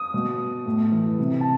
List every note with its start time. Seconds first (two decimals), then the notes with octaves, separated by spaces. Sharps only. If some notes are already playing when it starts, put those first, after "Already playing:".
Already playing: D#6
0.14 B2
0.66 A2
0.92 E3
1.18 C3
1.41 A5